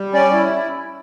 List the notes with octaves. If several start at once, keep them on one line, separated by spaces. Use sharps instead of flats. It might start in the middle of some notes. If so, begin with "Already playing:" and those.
Already playing: G3
C#4 D5
E4